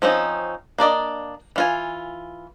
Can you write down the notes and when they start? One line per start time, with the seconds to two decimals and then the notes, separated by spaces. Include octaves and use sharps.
0.02 F3 C4 C#4 D#4
0.78 A#3 D4 D5 D#5
1.56 E3 F4 G#5